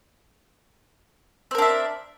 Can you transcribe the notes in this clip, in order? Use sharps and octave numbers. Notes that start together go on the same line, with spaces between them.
C4 D4 A#4 E5